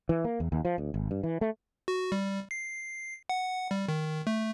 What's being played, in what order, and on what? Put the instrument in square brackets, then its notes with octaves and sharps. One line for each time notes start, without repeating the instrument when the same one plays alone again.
[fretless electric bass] E3
A#3
E2
D#2
F3
D2
G#1
G2
E3
A3
[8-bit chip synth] F#4
G3
C7
F#5
G3
D#3
A3